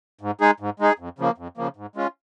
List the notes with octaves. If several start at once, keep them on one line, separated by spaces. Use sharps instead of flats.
G#2
G#3 D#4 G#4
G#2
G#3 D#4 G#4
F2
C#3 F3 A#3
F2
C#3 F3 A#3
G#2
G#3 C#4 F4